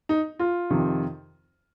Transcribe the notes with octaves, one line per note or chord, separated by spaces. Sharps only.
D#4
F4
F2 C3 D#3